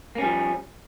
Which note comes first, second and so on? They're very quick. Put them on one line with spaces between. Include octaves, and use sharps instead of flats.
A#3 C#4 G3 F3